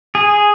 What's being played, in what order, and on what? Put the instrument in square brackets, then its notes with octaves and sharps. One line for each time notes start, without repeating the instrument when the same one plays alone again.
[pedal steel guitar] G#4